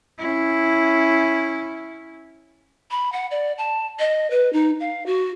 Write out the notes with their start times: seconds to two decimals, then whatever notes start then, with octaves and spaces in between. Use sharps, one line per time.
0.18 C#4 E4
2.91 B5
3.13 F#5
3.31 D5
3.58 A5
3.99 D#5
4.31 B4
4.53 D#4
4.80 F5
5.06 F#4